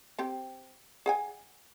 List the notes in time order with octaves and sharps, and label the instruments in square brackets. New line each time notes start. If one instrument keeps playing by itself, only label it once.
[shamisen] C4 G4 G5
G#4 F#5 G#5